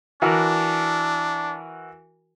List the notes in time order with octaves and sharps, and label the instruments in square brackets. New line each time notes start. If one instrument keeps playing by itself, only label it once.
[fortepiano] E3 F#4 A#4 [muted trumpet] D4